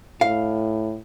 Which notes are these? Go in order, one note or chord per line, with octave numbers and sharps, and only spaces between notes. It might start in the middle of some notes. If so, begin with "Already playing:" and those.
A2 F5